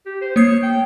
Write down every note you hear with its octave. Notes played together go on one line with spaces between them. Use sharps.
G4
C5
A#3 C#5 D#6 C7
G5